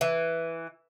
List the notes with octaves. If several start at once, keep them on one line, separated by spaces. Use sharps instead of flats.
E3